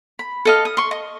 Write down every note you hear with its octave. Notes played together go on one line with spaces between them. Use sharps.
B5
A4 D#5 F5
D#6
C6 C#6
D#5